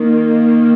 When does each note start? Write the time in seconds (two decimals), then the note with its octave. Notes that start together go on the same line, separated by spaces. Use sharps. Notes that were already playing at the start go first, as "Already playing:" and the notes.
Already playing: D#3 A#3